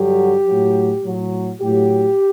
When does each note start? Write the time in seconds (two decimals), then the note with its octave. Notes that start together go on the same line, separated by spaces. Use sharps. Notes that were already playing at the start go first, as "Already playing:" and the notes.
Already playing: G2 D3 F#3 G4
0.45 A2 F#3
1.03 A2 F#3
1.61 A2 F#3 G4